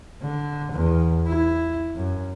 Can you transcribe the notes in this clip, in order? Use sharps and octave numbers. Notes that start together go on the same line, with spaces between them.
D3
E2
E4
F#2